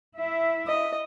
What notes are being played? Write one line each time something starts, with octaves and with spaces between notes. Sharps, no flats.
E4 E5
D#5